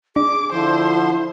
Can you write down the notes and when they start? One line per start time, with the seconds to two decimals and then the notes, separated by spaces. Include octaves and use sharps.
0.16 D4 G#4 D6
0.53 D3 F3 E4 C5 C6